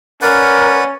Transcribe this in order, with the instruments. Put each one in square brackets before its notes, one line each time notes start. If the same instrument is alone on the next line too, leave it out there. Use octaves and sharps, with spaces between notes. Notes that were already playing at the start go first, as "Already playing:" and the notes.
[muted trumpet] C#4 [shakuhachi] A#4 [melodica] B4 D5 F#5